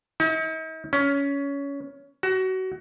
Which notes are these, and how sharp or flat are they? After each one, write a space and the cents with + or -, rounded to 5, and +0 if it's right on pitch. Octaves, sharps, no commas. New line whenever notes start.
D#4 +45
C#4 +20
F#4 +25